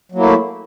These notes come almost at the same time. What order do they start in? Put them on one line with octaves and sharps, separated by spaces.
F#3 A#3 E4 A3